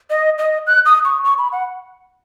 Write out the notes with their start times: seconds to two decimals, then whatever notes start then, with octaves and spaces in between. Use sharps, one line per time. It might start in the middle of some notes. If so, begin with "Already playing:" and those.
0.10 D#5
0.38 D#5
0.67 F#6
0.85 D#6
1.05 C#6
1.24 C#6
1.38 B5
1.52 F#5